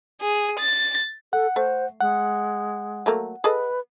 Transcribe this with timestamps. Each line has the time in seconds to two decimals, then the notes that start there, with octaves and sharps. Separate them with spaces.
0.22 G#4
0.59 A6
1.33 A4 F#5
1.56 A3 C5
2.01 G#3 F#5
3.06 F#3 A3 A#3
3.44 G#4 A4 B4 D#5